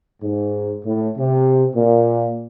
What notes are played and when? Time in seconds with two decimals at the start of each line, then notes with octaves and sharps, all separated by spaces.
0.22 G#2
0.85 A2
1.18 C3
1.76 A#2